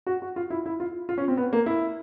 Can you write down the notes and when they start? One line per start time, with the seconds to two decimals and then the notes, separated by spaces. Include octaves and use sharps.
0.07 F#4
0.22 F#4
0.36 F4
0.50 E4
0.66 E4
0.80 F4
1.09 F4
1.18 C#4
1.28 C4
1.37 B3
1.53 A#3
1.66 E4